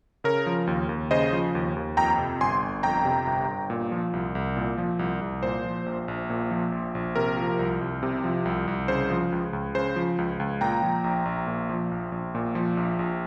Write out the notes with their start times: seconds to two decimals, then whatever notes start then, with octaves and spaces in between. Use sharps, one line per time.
0.24 C#3 A#4 C#5
0.46 F3
0.67 D#2
0.89 D#2
1.11 C#3 C5 D#5
1.32 F3
1.55 D#2
1.76 D#2
1.97 F2 G5 A#5
2.18 C3
2.40 G1 G#5 C6
2.62 G1
2.83 F2 G5 A#5
3.05 C3
3.27 G1
3.48 G1
3.70 A#2
3.92 F3
4.13 C2
4.35 C2
4.57 A#2
4.78 F3
4.99 C2
5.21 C2
5.43 A#2 C5
5.65 F3
5.86 A#1
6.08 A#1
6.30 A#2
6.51 F3
6.72 A#1
6.95 A#1
7.16 C3 A#4
7.37 F3
7.59 C2
7.81 C2
8.03 C3
8.24 F3
8.45 C2
8.67 C2
8.88 C#3 C5
9.10 F3
9.32 C#2
9.53 C#2
9.75 C#3 C5
9.96 F3
10.18 C#2
10.40 C#2
10.61 A#2 G5 A#5
10.82 F3
11.04 A#1
11.25 A#1
11.47 A#2
11.69 F3
11.91 A#1
12.12 A#1
12.35 A#2
12.55 F3
12.77 A#1
12.99 A#1